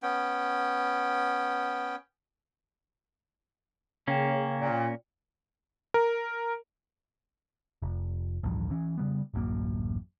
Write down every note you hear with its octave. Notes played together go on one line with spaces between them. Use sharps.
B3 C#4 G5
C#3 A#3 C#4 C#5 G5 E7
A#2
A#4
F1
A1 D2 G2 F3
E3 C#4
C#3 G3 B3
D1 A1 F#2 A#3